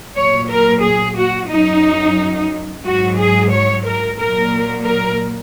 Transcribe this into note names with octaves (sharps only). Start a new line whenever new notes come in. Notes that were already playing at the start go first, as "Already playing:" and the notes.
A#2 F#3 C#5
A#4
G#4
F#4
F#2 F#3 D#4
G#2 F#3 F#4
G#4
C#5
A#4
A#2 F#3 A#4
A#4